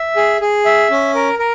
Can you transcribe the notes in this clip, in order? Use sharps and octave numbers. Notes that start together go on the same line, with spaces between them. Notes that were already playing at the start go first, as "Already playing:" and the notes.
Already playing: E5
G#4
G#4
E5
C#4
A#4
A#4